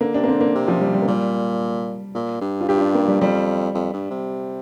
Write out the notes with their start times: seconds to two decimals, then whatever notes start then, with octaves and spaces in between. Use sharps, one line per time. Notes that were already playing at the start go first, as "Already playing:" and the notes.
0.01 D3 A#3
0.14 C3 D4
0.24 A#3
0.28 D3 C4
0.41 A#3
0.55 C3
0.68 F3
0.81 G3
0.94 G3
1.02 A#3
1.07 A#2 G3
2.15 A#2
2.41 G2
2.61 F4
2.69 G2 G4
2.77 F4
2.81 D4
2.95 A#3
3.08 G3
3.21 F2 G3
3.75 F2
3.93 G2
4.11 C3